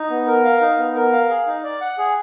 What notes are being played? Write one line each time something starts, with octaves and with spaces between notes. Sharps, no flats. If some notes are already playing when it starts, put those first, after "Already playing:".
Already playing: D#4
B3
A#4
F5
D#4
B3
A#4
F5
G#4
D#4
D5
F#5
G#4